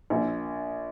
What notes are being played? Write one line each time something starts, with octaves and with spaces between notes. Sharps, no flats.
A#1